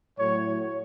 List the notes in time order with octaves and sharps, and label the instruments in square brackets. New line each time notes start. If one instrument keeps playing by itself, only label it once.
[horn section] A2 F#3 C#5